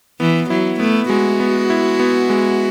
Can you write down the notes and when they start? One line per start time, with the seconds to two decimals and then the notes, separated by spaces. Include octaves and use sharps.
0.20 E3 B3
0.50 F#3 E4
0.80 A3 B3
1.10 G#3 F#4
1.40 B3
1.70 E4
2.00 B3
2.30 G#3